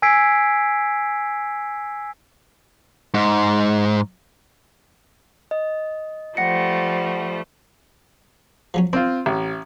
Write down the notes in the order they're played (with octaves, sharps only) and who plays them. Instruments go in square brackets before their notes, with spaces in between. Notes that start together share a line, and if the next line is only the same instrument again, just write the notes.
[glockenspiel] G#5 E6 G#6 B6 C7 D7
[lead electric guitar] G#2
[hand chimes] D#5
[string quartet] F3 G3 A3 [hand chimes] F#5 A#6 C#7
[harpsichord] F3 F#3 C#4
[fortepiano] C4 F4 [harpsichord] D4
[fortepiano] A1